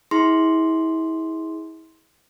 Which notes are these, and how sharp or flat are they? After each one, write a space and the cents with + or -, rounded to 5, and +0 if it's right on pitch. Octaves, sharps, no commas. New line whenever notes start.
E4 -35 G#4 +0 C6 +0